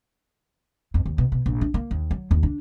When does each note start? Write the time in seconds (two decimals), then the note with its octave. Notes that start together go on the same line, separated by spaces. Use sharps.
0.94 F2
1.05 D#2
1.18 B2
1.32 B2
1.46 A#1
1.61 D4
1.74 A#3
1.91 D#2
2.11 F#3
2.31 D#2
2.43 D4